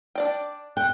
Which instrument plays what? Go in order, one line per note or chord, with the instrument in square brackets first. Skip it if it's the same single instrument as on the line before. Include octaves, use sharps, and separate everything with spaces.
[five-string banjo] D4 D5 G5
[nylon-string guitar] G5 [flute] F#6